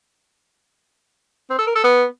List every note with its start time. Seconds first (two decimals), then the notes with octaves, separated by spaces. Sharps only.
1.50 C4
1.59 A4
1.67 A#4
1.75 A4
1.84 B3